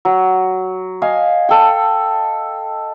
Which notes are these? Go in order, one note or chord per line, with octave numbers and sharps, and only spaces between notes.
F#3
D#5 F5 G#5
A4 G5